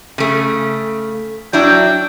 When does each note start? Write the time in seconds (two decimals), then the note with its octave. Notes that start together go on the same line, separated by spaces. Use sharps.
0.18 C#3 A3
1.53 F#3 D4 E4 G5